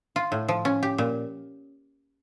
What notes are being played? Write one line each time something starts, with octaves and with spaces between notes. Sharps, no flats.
F4
A2
F3
C#4
G4
A#2